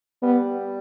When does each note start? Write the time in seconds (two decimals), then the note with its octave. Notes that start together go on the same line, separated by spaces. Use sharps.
0.22 G3 B3